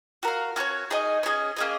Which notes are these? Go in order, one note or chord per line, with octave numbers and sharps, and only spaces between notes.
F#4 A#4 F5
C#4 F#4 A#4 C#5
D#4 G#4 D#5 G#5
C#4 G#4 D#5
A#3 C#4 G#4 D#5